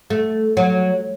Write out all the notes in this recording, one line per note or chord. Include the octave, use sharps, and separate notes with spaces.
A3
F#3